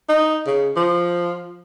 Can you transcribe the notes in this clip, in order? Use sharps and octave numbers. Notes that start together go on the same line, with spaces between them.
D#4
C#3
F3